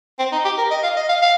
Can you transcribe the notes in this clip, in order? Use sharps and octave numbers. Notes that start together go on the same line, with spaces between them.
C4
D#4
G4
A#4
D#5
F5
D#5
F5
F5